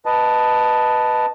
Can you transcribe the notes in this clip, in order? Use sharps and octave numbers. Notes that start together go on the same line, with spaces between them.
B4 D#5 A5